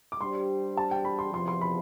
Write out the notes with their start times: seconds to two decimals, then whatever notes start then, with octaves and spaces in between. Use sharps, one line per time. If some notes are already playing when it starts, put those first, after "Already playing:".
0.12 D6
0.20 G3 D4 G4 C5 C6
0.77 A5
0.91 G5
1.05 B5
1.19 C6
1.33 E2 C3 F3 C6
1.48 C6
1.61 B5